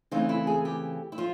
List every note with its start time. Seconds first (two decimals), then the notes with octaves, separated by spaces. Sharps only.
0.11 C#3 E3 A3 C4 D#4
0.29 E4
0.47 G#4
0.65 G4
1.12 E4
1.18 F3 F4